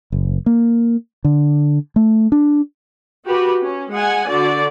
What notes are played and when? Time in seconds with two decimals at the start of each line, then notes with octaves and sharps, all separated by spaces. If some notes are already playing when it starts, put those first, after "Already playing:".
0.12 F#1
0.46 A#3
1.24 D3
1.96 A3
2.32 D4
3.25 F#4 G4 B4
3.63 C#4
3.92 G#3 F#5 G#5
4.27 D3 F#4 D5